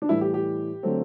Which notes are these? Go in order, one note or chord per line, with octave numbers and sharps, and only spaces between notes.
D4
A2 E3 G3 E4
G4
G4
D3 F#3 A3 C4